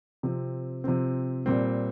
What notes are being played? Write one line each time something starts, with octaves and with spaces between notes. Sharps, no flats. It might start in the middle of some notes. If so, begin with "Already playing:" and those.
C3 F3 C4
C3 F3 C4
A#2 G3 C4